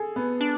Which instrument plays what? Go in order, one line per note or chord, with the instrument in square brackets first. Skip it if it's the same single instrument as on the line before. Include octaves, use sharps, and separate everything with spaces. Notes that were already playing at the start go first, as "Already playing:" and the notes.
Already playing: [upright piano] G#4 A4
B3
[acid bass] D4